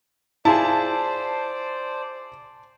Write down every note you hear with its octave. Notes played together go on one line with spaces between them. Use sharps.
E4 F4 G#4 C5 D5 A5